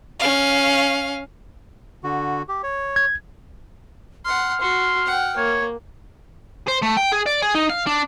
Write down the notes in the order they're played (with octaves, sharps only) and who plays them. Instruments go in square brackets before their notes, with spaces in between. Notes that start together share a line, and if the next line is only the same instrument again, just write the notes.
[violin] C#4 F5
[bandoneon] D3 F#4
G4
C#5
[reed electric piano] G#6
[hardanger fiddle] F#5 C6 [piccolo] F6
[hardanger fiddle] F#4 [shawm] C6
[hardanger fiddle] F#5 G5
[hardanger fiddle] A#3 [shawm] C#5
[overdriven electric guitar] C5
A3
G5
G#4
D5
G#4
D#4
F5
D4